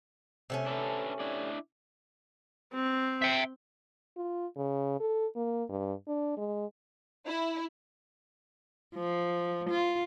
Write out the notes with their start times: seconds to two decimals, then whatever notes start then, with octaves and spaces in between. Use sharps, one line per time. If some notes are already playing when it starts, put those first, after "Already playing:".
0.50 C3 A3 C#4
0.66 D4 A4 B4
1.20 D4 E4 D5
2.74 C4
3.22 E5 G5
4.17 F4
4.57 C#3
5.00 A4
5.36 A#3
5.69 G2
6.07 D4
6.37 G#3
7.26 E4
8.95 F3
9.70 F4